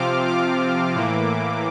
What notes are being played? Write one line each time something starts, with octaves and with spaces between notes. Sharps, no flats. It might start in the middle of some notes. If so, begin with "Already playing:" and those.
Already playing: C3 F3 C4 F4 D6 F6
D6
A2 E3 A#3